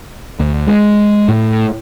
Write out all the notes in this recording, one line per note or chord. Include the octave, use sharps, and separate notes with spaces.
D2
G#3
A2